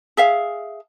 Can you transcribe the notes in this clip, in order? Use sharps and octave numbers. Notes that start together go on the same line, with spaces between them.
G#4 E5 F5